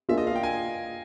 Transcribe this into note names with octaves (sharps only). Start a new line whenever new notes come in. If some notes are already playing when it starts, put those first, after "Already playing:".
A#3 D4 F4 G#4 E5
D#5
F5
G5
G#5